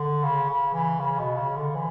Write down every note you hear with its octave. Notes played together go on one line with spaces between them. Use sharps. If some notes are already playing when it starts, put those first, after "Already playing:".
Already playing: D3
C#3
C#3
E3
C#3
B2
C#3
D3
E3